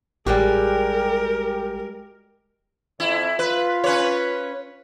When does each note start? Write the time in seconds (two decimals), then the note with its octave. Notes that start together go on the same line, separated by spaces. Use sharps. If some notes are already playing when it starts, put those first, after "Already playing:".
0.26 A1 G3 G#3 F#4 G4 A#4 G5
3.00 F2 E4
3.39 F4 B4
3.84 C#4 B4 C#5